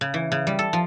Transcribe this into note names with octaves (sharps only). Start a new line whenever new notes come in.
C#3
E3
C#3
G3
A4
F3